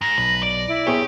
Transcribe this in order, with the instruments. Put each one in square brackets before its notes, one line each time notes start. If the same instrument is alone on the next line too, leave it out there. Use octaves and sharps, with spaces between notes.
[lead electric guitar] G#2 [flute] A#6
[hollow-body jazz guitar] B1 [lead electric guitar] B4
[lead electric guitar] D5
[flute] E4
[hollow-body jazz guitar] B3 G#4 C#5 [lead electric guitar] G4